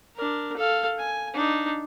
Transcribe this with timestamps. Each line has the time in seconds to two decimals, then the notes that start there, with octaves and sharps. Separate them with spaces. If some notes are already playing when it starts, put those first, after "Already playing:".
0.16 D4 A#4
0.57 A4 F5
0.99 G#5
1.34 D4 D#4